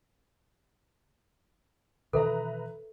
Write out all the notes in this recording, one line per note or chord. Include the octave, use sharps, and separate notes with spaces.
B2 D#3 E3 A4 B4 E5 A#5